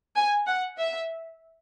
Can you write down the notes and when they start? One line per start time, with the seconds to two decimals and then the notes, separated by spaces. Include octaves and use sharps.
0.16 G#5
0.47 F#5
0.78 E5